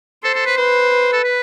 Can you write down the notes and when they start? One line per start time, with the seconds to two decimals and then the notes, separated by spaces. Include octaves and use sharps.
0.24 A4 C5
0.34 A4
0.46 B4
0.57 B4 C5
1.12 A4
1.24 B4